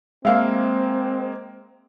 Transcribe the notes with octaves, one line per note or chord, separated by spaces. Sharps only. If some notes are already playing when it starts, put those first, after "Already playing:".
G#3 A#3 C4 E5 F5